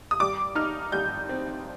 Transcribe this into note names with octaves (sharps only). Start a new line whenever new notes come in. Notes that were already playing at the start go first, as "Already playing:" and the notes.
D#6
G3 D6
D#4 F6
G3 G6
C4